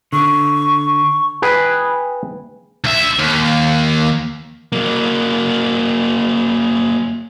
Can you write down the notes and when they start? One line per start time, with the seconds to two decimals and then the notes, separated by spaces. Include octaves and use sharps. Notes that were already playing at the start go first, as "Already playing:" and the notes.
0.13 D3 C#6
1.42 G#4 B4 G5
2.84 D2 E5
3.19 D#2
4.72 F#3 A#3